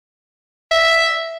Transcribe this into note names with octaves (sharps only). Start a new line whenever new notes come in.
E5